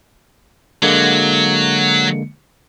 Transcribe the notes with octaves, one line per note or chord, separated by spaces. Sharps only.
D3 F#3 G#3 A#3